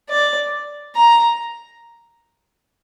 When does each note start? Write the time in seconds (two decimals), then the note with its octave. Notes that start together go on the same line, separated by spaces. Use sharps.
0.09 D5
0.96 A#5